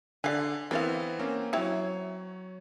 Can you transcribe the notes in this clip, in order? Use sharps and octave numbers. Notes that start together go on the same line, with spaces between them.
D3 D5 F5 G#5
E3 B3 C4 A#4 D5 F5
A#3 C4 C#4
F#3 C4 E4 C#5